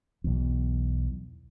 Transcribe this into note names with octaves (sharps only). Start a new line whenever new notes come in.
B1 E2